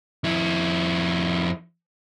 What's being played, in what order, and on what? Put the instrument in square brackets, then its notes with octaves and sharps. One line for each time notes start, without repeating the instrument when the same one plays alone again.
[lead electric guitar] F2 E4